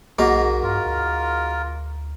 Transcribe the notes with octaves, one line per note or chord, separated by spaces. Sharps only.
B1 G#2 F#3 A#3 D#4
G2 F4 A#4
D2